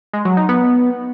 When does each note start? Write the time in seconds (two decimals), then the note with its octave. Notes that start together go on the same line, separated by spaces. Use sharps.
0.13 G#3
0.25 F#3
0.37 D#4
0.49 B3